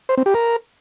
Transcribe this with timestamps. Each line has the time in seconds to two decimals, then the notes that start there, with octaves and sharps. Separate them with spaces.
0.09 C5
0.17 C4
0.26 G4
0.34 A#4